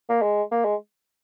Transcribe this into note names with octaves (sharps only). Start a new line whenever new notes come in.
A#3
G#3
A#3
G#3